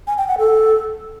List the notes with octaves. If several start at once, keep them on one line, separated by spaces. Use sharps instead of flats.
G#5
G5
F#5
A4